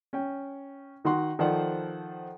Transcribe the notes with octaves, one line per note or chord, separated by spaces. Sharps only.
C#4 G5
D#3 D#4 F#4 F#5 C6
D#3 F3 A4 C5 D5 F#5